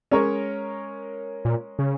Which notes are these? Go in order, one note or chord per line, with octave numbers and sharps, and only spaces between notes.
G#3 C#4 A#4 C#5
A#2
C#3